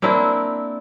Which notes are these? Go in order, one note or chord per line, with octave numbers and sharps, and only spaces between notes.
A#3 C4 D4 E4